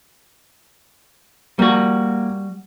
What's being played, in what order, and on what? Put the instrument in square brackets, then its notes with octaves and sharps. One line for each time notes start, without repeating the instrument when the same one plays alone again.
[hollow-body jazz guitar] G3 F#4 [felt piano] A#3